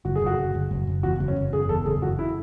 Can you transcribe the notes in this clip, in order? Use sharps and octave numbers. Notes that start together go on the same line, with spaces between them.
F#1 F#4
G#4
F#1 F#4
F#1
F#1
F#1
F#1
E2 F#4
F#1
C#4
F#1
F#1 G#4
E2 A4
F#1 G#4
F#1 F#4
E4